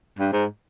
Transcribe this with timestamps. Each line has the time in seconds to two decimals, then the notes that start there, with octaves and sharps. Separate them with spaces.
0.19 G2
0.32 G#2